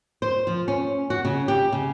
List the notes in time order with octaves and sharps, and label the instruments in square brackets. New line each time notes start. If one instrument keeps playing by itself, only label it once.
[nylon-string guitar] C5
F3
C#4
F#4
C#3
G4
C#3